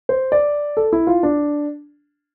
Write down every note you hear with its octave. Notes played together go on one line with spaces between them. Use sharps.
C5
D5
A4
E4
F4
D4